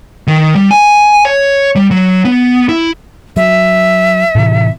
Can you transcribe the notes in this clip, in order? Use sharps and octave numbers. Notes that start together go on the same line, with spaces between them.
D#3
G3
G#5
C#5
G3
F#3
B3
E4
F#3 E5
A2 C3 E3